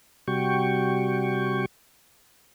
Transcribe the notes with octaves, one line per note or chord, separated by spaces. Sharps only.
C3 G3 F#4 G5 C#6